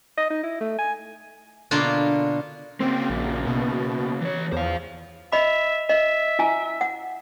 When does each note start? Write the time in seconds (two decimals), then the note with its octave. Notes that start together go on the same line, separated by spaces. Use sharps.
0.18 D#5
0.31 D#4
0.44 E4
0.61 A3
0.78 G#5
1.71 B2 D3 A#3 D4 F4
2.80 C#3 A#3 C4
3.10 A#1
3.47 B2
4.21 E3 C#5
4.53 E2 C5 F5
5.33 D#5 E5 B5
5.90 D#5 E5
6.39 E4 G#5 A#5
6.81 F#5